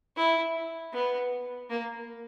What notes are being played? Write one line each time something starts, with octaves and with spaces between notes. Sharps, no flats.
E4
B3
A#3